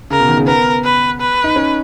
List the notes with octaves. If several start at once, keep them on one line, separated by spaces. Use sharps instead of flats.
C#3 A#4
B2
D#3
C#3
B3 A#4
B4
B4
D#4
C#4